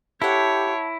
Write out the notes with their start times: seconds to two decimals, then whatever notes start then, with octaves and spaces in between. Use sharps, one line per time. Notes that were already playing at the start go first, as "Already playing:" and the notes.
0.22 E4 G4 A4 C#5 F#5